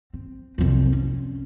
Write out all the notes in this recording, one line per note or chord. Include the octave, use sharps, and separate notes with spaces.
C4
C2 F2
C#4